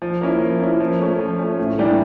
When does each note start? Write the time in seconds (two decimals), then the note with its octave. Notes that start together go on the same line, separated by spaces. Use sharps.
0.02 F3
0.21 A#3 C#4 E4
0.41 F3
0.60 A#3 C#4 E4
0.80 F3
1.00 A3 C#4
1.19 F3
1.39 A3 C#4
1.59 A2
1.78 E3 G3 A#3 D4